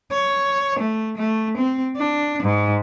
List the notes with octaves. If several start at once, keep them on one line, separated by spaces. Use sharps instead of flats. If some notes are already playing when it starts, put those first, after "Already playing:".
C#5
A3
A3
C4
D4
G#2